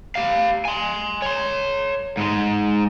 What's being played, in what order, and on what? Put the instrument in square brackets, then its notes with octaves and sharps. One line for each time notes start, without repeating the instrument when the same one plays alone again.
[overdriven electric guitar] G4 F5
G#5 C6
C#5 C6
G#2 G#3